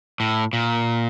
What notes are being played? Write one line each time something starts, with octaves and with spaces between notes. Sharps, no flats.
A2
A#2